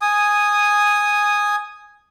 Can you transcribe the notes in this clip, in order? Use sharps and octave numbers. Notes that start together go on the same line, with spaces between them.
G#5 D#6